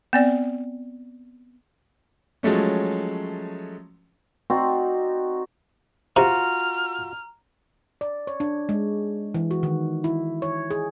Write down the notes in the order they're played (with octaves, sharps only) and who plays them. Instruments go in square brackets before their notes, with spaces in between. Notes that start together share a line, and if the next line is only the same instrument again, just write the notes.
[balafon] B3 C4 D5
[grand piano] F3 F#3 G#3 A3 C#4
[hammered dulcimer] C4 D#4 F#4 D5
[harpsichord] C3 [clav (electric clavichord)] F4 F#4 [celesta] A#5 [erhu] F6
[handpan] D5
C#5
D4
G#3
E3
F#4
D#3
E4
C#5
G#4